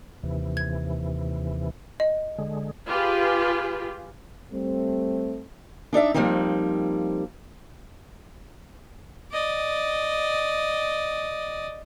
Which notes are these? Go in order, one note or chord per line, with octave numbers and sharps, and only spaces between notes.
D#2 C3 E3
G#6
D#5
D3 G#3
F4 G4 G#4 B4
G3 A3 C4
D4 D#4 D5 E5
F3 G3 A3 A#3 C4 D#4
D5 D#5